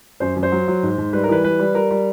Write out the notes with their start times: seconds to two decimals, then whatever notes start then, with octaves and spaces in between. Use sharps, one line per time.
0.20 F#2 C5
0.36 F#2
0.43 C5
0.52 F#3
0.68 F#3
0.83 G#2
0.98 G#2
1.13 G3 B4
1.23 A#4
1.29 E3 B4
1.44 G3 B4
1.59 G3
1.75 G3 A#4
1.91 G3